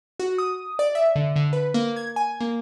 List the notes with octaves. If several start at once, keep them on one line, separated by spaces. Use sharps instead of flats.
F#4
D#6
D5
E5
D3
D3
B4
A#3
G#6
G#5
A#3